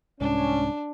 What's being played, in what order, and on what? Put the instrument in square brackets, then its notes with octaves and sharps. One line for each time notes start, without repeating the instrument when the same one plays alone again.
[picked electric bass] C2 G#2 [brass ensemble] C#4 [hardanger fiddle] D4